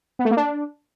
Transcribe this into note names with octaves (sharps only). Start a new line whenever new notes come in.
B3
A3
A#3
D4